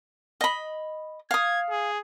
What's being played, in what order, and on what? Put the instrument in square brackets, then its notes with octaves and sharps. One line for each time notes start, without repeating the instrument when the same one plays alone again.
[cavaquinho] D#5 B5
[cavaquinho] F5 D#6 [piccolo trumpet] G#6
[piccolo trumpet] G#4